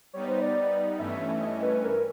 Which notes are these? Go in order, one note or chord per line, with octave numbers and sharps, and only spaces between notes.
G3 B3 D#4 C#5
C5
D5
G2 E3 A3 C#4 E5
D#5
B4
A#4